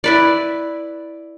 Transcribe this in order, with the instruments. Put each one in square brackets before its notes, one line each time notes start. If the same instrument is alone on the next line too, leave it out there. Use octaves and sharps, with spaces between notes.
[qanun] E4 B4 D5